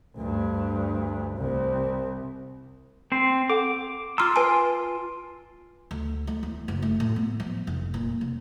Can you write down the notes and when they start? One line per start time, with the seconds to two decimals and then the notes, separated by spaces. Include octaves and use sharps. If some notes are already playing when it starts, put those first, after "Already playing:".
0.17 D2 G2
1.37 C2
3.12 C4 C5
3.50 A4 F#5 D6
4.18 F4 A#5 C6 D6 E6 F6
4.36 B4 G#5 A5
5.91 D2
6.27 A3
6.43 E2
6.68 F#1
6.82 A3
7.00 A2
7.16 B3
7.40 F3
7.67 F1
7.94 A#2
8.21 F1